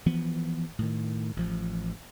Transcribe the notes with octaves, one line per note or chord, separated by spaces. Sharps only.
E3 F3 B3
A2 D#3
A1 F3